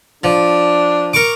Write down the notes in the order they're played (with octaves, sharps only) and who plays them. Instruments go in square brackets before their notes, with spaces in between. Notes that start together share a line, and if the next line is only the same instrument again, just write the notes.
[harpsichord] F3 [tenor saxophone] D4
[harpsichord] A#4 C#6 D6